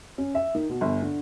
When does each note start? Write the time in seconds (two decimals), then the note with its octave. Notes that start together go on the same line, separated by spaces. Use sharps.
0.18 C#4
0.35 E5
0.55 D#3
0.70 B2
0.81 G1
1.02 D3